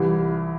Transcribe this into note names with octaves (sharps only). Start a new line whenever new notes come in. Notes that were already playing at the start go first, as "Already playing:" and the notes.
Already playing: C2 C3 E3 F4